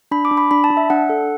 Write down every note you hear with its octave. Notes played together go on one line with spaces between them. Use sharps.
D4 B5
D6
D4
B5
D4 B5
A5
D4
E5
D4 F#5
A4